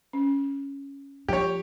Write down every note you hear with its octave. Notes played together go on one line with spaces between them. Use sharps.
C#4
F3 G4 C#5